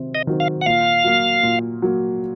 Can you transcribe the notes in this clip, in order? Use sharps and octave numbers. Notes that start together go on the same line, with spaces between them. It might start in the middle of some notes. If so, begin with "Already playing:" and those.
Already playing: C3 D#3 F#3 C4
D#5
D#3 F#3 C4
F5
F#5
A#2 F5
F#3 A#3
A#2
F#3 A#3